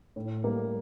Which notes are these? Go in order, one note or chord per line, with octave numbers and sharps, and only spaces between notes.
A2
G3 A#3